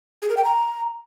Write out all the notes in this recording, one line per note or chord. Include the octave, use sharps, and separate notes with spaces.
G#4
A#4
G5
A#5